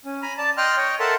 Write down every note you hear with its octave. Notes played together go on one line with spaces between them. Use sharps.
C#4
G#5 A#5 B5
D5 A5
D#5 G5 C6 F6 F#6
C#5 D#5 G5
A4 A#4 E5 F#5 A5 C6